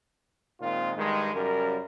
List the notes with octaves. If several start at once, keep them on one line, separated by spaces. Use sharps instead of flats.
A#2 D#3 G#3 C4 F4
G2 D#3 G#3
F#2 C#3 G3 A#4